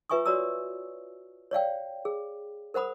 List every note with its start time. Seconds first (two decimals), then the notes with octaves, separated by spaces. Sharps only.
0.09 F4 B4 E5 G#5 C#6 D#6
0.25 F#4 C#5 D5 A#5 D#6 E6
1.51 C#5 D5 F5 G5
2.05 G#4
2.74 A#4 C5 F#5 B5 D#6